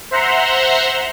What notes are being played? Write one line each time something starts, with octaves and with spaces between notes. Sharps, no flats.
C5 E5 F#5 A#5 C6